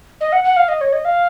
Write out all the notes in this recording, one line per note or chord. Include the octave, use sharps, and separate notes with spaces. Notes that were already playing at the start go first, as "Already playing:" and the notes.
D#5
F#5
F#5
F5
D#5
C#5
D#5
F5